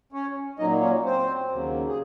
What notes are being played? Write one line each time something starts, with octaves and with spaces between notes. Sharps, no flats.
C#4 C#5
A#2 F#3 A#3 D#4 D#5
C#4 C#5
C4 C5
D#2 C#3 F#3 A#3
G#4